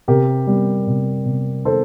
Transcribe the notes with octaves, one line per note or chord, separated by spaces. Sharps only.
C3 G4 A#4
G3
C3
C3
D#3 A4 C5